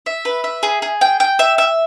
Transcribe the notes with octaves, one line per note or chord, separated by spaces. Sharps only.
E5
B4
E5
G#4
G#4
G5
G5
E5
E5